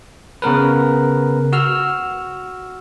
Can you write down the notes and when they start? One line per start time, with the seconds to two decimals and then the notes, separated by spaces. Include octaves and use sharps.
0.42 C#3 B3 A#4 B4
1.53 F#4 E6 F6